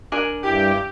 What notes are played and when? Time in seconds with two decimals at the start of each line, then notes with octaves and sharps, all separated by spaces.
0.12 D4 A#4 G#5
0.44 G2 E4 G4 G5